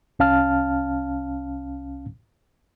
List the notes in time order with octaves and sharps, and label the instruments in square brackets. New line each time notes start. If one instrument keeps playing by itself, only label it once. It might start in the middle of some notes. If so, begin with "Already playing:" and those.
[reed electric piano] C2 C#4 F5 A5 F6